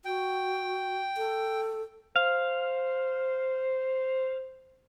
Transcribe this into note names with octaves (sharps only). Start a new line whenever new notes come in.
F#4 G5
A4
C5 F5